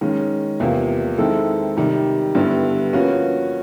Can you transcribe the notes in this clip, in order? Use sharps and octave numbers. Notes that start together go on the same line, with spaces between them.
D#3 G#3 C#4
E2 C3 F3 A#3
D#3 G#3 C4 E4 A4
C3 D#3 G3
G2 D3 G3 B3 E4
F3 A#3 C#4 F#4 B4